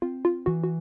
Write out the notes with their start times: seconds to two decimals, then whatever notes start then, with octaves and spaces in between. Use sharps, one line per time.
0.02 C4 F4
0.25 F4
0.46 E3 F#4
0.64 F#4